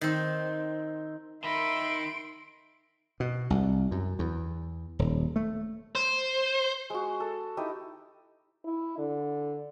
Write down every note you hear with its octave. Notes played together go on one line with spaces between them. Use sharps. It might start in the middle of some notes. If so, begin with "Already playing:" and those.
D#3 C4
D#3 D#4 E5 B5 C6 D7
B2
C2
F#2
E2
D#1
A3
C5
G#3 F#4
A4
D#4 E4 G4 D#5
E4
D3